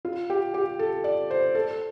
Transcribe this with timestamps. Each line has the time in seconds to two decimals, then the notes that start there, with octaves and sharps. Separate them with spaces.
0.05 F4
0.30 G4
0.54 G4
0.79 A4
1.04 D5
1.31 C5
1.55 A4